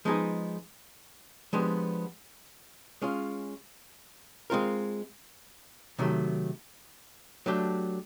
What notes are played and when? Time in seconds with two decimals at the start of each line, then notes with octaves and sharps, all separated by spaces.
0.05 F3 G#3 B3 D#4 G#4
1.53 F3 G#3 B3 D4 G4
3.02 G#3 C#4 F4
4.50 G#3 C4 F4 A#4
5.99 C3 D#3 F#3 A3
7.46 F#3 A3 D4 G4